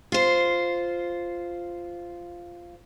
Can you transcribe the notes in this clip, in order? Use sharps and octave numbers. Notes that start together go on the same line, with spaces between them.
F4 C5